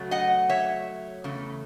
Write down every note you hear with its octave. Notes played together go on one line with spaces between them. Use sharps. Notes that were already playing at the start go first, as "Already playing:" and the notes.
Already playing: C#3 F#3 A3
D#5 F#5
C#5 E5
E2 C#3 A3